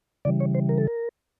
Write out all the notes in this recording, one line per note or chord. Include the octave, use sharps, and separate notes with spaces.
C#3 E3 G3 D5
C#5
C5
A#4
A4
A#4